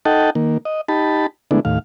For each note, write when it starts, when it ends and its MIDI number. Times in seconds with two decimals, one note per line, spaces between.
0.05 0.30 63
0.05 0.30 69
0.05 0.30 75
0.05 0.30 78
0.05 0.30 79
0.05 0.30 81
0.35 0.58 51
0.35 0.58 58
0.65 0.81 75
0.88 1.27 63
0.88 1.27 67
0.88 1.27 81
0.88 1.27 83
1.51 1.60 50
1.51 1.60 56
1.51 1.60 57
1.51 1.60 59
1.51 1.60 62
1.51 1.60 64
1.65 1.79 39
1.65 1.79 45
1.65 1.79 77